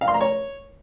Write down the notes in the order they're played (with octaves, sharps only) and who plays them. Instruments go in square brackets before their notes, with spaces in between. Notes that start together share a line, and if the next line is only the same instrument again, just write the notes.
[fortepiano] F5
C6
A#5
C#5